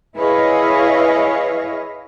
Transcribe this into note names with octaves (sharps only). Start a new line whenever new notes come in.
E4 G#4 B4 C#5 D#5 F5